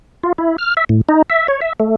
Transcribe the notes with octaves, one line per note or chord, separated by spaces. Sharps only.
F4
E4
F6
E5
A2
D#4
E5
C#5
E5
A3